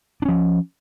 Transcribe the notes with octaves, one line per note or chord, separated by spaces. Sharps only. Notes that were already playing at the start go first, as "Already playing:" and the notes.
F3 C#4 D4